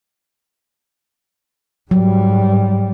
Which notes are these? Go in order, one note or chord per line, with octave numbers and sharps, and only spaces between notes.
G#2 F#3 G3